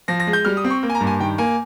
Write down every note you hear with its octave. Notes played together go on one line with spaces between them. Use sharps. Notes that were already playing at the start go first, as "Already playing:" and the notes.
F3 A#6
A#6
G#3
G6
G3 F6
D#6
C4
C#6
A#3
G#5
A#5
G2
G#5
D#3 G5
A#3 G#5